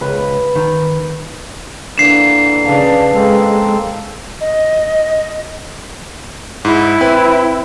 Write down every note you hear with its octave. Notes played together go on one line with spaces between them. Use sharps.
C#2 B4
D#3
D3 E3 A#3 D4 C7 E7
C#3 D4 B4 F5 A5
G#3 A#3 C4 A4
D#5
G#2 E4
C4 B4